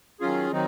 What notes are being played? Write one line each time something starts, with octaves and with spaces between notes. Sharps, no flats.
D#3 F#3 C#4 F4 G#4
D#3 F#3 C4 D#4